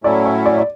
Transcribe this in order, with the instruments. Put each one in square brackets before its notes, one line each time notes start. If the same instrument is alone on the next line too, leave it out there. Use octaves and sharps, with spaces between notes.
[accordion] A2 F#3 A3 C#4 E4 [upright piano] D5
[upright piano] C#5
D5
D5